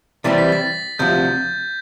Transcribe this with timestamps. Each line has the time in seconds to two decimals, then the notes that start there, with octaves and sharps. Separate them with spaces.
0.24 C3 E3 G3 C4 A6
0.38 B6
0.52 A6
0.99 D2 C3 F3 G6